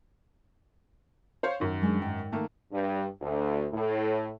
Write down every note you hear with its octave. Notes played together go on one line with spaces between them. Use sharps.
C5 C#5 F5
F#2 D#3
F#3 G#3 D4
G#2 G5
D#3 A3 A#3
G2
D2
A2